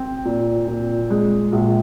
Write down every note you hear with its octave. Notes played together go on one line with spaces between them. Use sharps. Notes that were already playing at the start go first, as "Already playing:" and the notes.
Already playing: C4
A#2
A#2
G#3
A#1